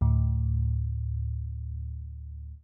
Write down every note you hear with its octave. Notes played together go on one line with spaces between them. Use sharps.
D2 A2